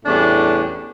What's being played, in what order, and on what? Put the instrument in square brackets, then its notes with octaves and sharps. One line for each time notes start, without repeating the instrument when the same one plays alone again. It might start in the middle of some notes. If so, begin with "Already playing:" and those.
[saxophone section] E2 A2 G3 C#4 D4 D5